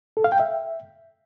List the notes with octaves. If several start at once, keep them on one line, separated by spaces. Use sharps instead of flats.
A4
F5
G5
E5